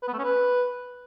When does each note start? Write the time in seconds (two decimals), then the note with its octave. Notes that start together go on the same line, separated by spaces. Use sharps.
0.03 B4
0.08 B3
0.13 A3
0.19 C#4
0.24 B4